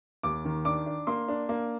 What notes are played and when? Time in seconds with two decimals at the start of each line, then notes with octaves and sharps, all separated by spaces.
0.23 D#2 D6
0.45 D#3
0.65 D4 D6
0.86 D4
1.07 A#3 C6
1.28 D4
1.49 A#3